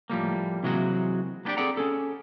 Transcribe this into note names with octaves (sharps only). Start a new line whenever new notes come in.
A2 F3 G3 A#3
C3 E3 F#3 G#3 A#3 F#4
A#3 B3 D4 G4 D5
C4 G#4 A4 D5 F#5 A#5
C#4 G#4 A4